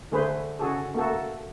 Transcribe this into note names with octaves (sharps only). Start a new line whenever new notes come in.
D3 A3 G#4 B4 C5
C#3 F#4 G#4 A4
A3 A#3 F#4 A4